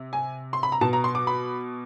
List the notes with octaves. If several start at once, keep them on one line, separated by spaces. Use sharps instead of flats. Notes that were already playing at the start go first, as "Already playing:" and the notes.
Already playing: C3
G#5
C6
B5
A#5
B2 A5
A#5
C6
D6
B5